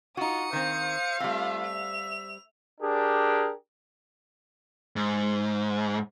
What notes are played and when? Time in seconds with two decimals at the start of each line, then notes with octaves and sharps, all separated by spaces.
0.17 D#4 F4 F#4 D#6 C#7
0.53 D#3 C4 C5 F5
1.20 G3 A3 C4 F4 E5
1.66 F7
2.81 D4 G4 G#4 A#4
4.96 G#2